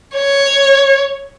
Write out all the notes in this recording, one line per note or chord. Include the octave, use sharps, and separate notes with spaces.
C#5